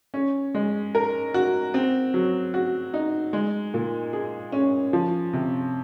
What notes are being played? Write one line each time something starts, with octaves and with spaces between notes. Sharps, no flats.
C#4
G#3
A#4
F#4
C4
F#3
F#4
D#4
G#3
A#2
G#4
C#4
F3
C3